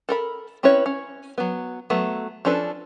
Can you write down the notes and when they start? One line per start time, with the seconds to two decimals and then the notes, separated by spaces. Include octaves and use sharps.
0.09 A4 A#4 B5
0.63 C4 C#4 E4 B4 C#5
0.86 C#4
1.38 F#3 B3
1.90 F#3 A3 B3
2.45 F3 C#4 D4 A4 B4